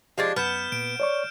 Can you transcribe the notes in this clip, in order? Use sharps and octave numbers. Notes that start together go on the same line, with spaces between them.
F3 G#3 D4 G4
F#2 B3 F6 G6 E7
A#2 D7
C#5 D5 C#6